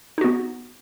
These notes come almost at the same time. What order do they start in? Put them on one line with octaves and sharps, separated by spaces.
D#4 F#4 B3